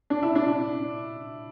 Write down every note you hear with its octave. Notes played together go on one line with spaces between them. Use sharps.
D4
E4
D4